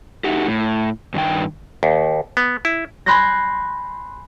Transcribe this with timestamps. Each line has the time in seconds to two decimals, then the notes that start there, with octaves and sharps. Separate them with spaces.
0.24 A3 D#4 F#4 G4
0.48 A2
1.14 G2 D#3 D4 G5
1.83 D#2
2.37 B3
2.65 E4
3.06 G#5 B5 C6 F#6 G6 A#6